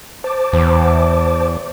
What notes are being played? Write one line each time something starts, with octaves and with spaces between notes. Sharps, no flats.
C5 A5 D6
E2